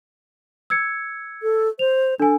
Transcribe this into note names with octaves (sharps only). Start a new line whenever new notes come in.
E6 G#6 C#7
A4
C5 F7
D4 A4 G#5